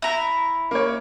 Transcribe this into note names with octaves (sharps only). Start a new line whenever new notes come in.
E4 A#5
A#3 C#5